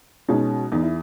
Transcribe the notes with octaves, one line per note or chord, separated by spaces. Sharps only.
B2 G#3 C#4 D#4
E2 D#4
E4